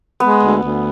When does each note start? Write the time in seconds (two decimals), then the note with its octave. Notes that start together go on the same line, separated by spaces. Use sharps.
0.20 G#3 B3
0.42 D2
0.65 D2